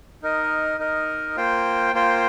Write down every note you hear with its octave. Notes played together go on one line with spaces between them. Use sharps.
D#4 A#4 D#5
D#4 A#4 D#5
A#3 F4 C5 G5
A#3 F4 C5 G5